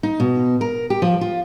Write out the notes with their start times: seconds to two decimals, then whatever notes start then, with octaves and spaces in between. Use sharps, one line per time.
0.03 D#4
0.20 B2
0.61 A#4
0.90 G4
1.02 F3
1.21 F4